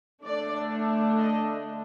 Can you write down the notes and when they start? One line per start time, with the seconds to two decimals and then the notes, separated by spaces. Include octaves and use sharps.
0.23 D3 A3 D4 D5
1.18 D#5